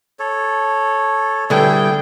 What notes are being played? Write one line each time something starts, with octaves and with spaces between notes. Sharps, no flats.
A4 C#5
D3 G3 B3 E4 G#4 G5